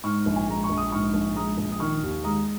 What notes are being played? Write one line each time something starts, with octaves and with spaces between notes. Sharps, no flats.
G#2 C#6 F6
A#1
G#5
G#3 A#5
C#6
A#1
D#6
G#2 C#6 F6
A#1
G#3 A#5 D#6
A#1
D#6
D#3 C#6 F6
D#2
G#3 A#5 D#6